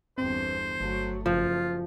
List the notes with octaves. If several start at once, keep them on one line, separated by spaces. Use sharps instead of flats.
G1 E2 C4 C5
G1 F#3 A3
F#1 F3 F4